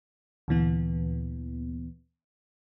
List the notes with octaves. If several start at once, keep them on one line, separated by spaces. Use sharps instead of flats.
D2 A#2 E3 B3